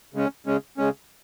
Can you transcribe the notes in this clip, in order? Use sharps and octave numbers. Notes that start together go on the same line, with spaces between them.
C#3 G#3 C#4
C#3 G#3 C#4
C#3 G#3 C#4